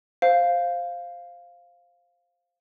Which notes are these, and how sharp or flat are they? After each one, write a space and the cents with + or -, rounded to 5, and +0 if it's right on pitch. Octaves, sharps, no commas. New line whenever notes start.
C5 +0 F5 +0